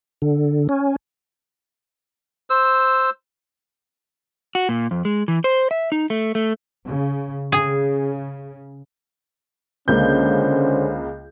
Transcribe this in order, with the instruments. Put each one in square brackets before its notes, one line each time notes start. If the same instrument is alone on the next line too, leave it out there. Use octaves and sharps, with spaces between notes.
[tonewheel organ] D3
C#4
[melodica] C5 E6
[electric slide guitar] F#4
A#2
F2
G#3
E3
C5
E5
D#4
A3
A3
[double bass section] C#3
[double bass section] C#3 [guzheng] G#4
[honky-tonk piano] C#2 A#3 G6 [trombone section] D3 C#4 C5